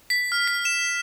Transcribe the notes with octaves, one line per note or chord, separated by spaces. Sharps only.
B6
F6
B6
E7